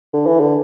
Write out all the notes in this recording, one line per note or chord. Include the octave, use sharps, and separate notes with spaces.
D3
E3
D3